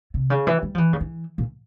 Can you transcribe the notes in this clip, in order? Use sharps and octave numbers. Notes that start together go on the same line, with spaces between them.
C3
C#3
E3
G3
F3
E3
C#3
E3
A#2